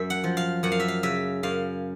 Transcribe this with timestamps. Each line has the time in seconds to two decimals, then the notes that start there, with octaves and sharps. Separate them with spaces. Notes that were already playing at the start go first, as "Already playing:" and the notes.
Already playing: F#2 E5
0.10 F#5
0.24 F3
0.37 F5
0.63 F#2 F#5
0.72 F5
0.80 E5
0.88 F5
1.03 C#3 E5
1.43 F#2 F5